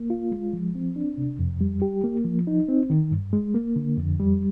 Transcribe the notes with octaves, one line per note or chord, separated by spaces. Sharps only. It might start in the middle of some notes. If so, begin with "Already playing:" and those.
Already playing: A#3
F4
G#3
F3
C4
D4
C3
F2
G3
G4
A#3
F3
D#4
C4
D#3
G2
G#3
A#3
D3
F2
G3